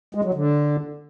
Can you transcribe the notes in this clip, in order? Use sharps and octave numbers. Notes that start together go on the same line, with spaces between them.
G#3
F#3
D3